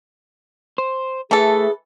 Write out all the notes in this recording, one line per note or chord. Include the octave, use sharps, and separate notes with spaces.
C5
E3 A3 G#4 A4